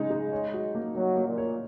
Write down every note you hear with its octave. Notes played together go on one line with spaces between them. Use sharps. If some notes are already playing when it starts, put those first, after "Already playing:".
Already playing: C#3 G#3 D#4
D#4
C#5
F#4
A#3
F#3 A#3
A#3
A#2
C#5